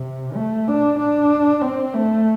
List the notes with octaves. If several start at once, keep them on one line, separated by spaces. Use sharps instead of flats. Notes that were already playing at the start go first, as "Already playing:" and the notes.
Already playing: C3
A3
D4
D4
C4
A3